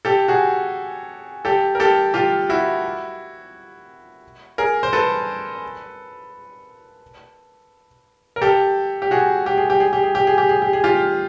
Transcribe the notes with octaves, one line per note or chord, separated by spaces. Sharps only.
G4 A4
F#4 G#4
G4 A4
A#4
G4 A4
F4 G4
E4 F#4
G#4 A#4
C5
A4 B4
A#4
G4 A4
G4
F#4 G#4
G4
G#4
G4
G#4
G4
G#4
G4
G#4
G4
G#4
G4
G#4
F4 G4